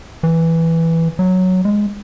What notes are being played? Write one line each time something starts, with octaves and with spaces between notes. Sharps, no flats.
E3
F#3
G#3